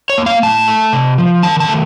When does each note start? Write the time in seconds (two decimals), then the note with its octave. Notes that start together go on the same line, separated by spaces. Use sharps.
0.10 C#5
0.18 A#3
0.26 F5
0.43 A2 A5
0.68 A3
0.93 C3
1.18 F3
1.43 D#3 A5
1.60 A5
1.68 A3